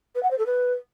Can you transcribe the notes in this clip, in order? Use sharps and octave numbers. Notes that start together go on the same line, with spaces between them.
B4
F#5
C5
A4
B4